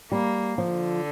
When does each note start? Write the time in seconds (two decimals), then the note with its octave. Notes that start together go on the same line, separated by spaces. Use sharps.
0.11 G3 A#3
0.57 D3 F3